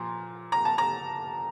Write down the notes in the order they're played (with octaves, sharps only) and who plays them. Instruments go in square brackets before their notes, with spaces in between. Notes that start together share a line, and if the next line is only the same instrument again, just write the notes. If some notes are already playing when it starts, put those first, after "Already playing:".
Already playing: [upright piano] A#2 F3 A#5 C6
A#5
A5
A#5